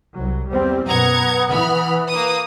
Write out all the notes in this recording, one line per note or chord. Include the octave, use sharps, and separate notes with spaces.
C2 F#3
E2 G3 C4 C5
F#2 B2 B4 F#5 A#5 D#6 G#6 C#7
E3 B5 F6
A#3 B4 D#6